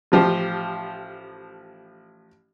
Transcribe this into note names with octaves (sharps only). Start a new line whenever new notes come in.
A1 F3 G4